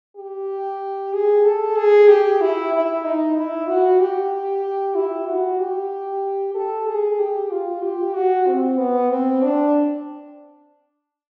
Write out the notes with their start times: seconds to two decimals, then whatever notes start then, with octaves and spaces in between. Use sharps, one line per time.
0.17 G4
1.13 G#4
1.45 A4
1.77 G#4
2.09 G4
2.41 E4
2.73 E4
3.04 D#4
3.36 E4
3.68 F#4
4.00 G4
4.95 E4
5.27 F#4
5.59 G4
6.55 A4
6.87 G#4
7.19 G4
7.51 F4
7.82 G4
8.14 F#4
8.47 C4
8.78 B3
9.10 C4
9.42 D4